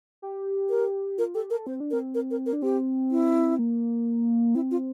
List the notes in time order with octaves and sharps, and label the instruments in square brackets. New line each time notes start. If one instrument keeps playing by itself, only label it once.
[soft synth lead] G4
[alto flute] A#4
[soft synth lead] F4 [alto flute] A#4
[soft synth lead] G4 [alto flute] A4
[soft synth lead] A4 [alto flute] A#4
[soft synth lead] C4 [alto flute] C5
[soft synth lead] D4
[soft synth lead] C4 [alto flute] A#4
[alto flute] A#4
A#4
A#4
[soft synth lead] D4
[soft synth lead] C4 [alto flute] G4
[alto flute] E4
[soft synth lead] A#3
[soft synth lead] C4 [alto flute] E4
[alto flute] F4